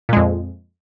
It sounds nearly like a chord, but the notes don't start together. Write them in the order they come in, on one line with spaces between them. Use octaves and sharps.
A#2 G#3 F2